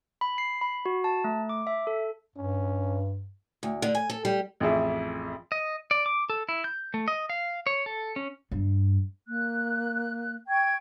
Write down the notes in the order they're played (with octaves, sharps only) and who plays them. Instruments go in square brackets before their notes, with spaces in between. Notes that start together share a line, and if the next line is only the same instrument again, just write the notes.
[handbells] B5
C7
B5
F#4
A5
A3
D6
E5
A4
[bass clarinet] G2 [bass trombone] C#4
[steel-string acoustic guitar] D2
D3
G#5
A4
G3
[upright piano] A1 F2 G#4 E5
[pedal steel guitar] D#5
D5
D6
A4
E4
G6
A3
D#5
F5
C#5
A4
C#4
[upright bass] G2
[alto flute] A#3 [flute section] F#6
[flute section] G5 C#6 G#6